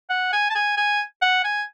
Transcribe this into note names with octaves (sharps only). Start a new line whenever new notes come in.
F#5
G#5
A5
G#5
G#5
F#5
G#5